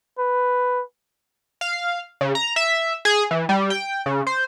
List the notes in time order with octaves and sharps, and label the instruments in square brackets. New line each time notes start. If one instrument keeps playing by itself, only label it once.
[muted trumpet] B4
[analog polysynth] F5
C#3
A#5
E5
G#4
E3
G3
G5
C#3
C5